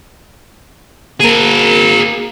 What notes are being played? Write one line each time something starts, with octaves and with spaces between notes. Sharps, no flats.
A#3 G#4 A#4